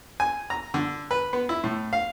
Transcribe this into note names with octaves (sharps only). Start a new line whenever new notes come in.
G#5
A#5
D3
B4
B3
E4
A2
F5